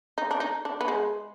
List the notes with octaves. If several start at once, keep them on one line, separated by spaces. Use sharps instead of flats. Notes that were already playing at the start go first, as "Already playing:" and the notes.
D#4
D4
D#4
D4
B3
G#3